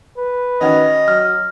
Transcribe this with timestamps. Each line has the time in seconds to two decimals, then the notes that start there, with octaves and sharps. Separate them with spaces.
0.18 B4
0.61 D#3 C#4 F#4 D#5
1.08 F#3 F6